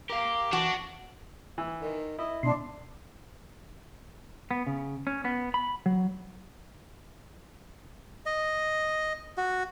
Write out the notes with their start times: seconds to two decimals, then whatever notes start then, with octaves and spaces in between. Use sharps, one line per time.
0.10 G4 A#4 F5
0.53 E3 D4 F#4
1.58 E3
1.81 D#3
2.19 E4 D#5
2.43 B2 D4 C6
4.51 B3
4.67 C#3
5.07 C#4
5.25 B3
5.54 B5
5.86 F#3
8.26 D#5
9.38 F#4